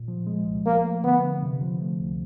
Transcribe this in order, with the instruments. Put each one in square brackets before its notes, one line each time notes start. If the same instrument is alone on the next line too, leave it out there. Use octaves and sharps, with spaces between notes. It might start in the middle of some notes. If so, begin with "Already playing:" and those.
Already playing: [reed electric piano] A#2
F3
G#3
C2
[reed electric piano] F3 [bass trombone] A#3
[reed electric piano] A3
[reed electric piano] D3 [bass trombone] B3
[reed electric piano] D3
C3
F3
A3
C#2